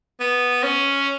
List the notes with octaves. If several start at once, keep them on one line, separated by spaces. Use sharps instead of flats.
B3
C#4